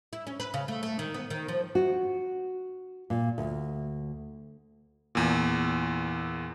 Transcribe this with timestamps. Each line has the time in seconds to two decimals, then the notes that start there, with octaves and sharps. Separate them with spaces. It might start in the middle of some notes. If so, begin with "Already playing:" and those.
0.13 E4
0.27 C#4
0.40 B4
0.54 C#3
0.68 A3
0.83 A3
0.99 D#3
1.14 B3
1.30 D#3
1.48 F3
1.75 F#4
3.10 A#2
3.38 D2
5.15 E2 A#2